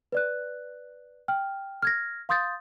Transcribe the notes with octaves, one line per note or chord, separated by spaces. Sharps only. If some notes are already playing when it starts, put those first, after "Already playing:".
B4 D5 F#6
G5 F6
F6 G#6 A#6
F5 C6 D#6 G6 A6